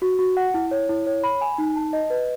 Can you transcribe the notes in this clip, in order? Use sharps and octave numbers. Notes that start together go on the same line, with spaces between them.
F#4
F#4
F#5
E4
C#5
E4
C#5
B5
G#5
D#4
A5
D#5
B4